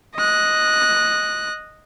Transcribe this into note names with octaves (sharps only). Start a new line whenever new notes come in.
D#5 F#6